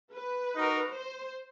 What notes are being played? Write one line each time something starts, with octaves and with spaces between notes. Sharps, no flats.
B4
D#4 F#4 A#4
C5